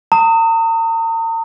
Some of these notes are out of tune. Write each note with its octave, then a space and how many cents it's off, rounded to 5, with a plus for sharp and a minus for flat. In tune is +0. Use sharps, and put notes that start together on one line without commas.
A#5 -40 D#6 +15